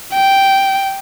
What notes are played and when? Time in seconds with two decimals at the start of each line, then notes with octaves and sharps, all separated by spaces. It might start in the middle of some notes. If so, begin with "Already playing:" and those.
0.13 G5